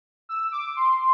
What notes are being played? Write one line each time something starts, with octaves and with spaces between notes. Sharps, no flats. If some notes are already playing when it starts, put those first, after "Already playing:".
E6
D6
C6